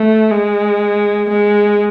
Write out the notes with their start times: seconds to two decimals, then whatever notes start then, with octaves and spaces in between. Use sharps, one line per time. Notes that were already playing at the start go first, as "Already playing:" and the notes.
Already playing: A3
0.31 G#3
1.30 G#3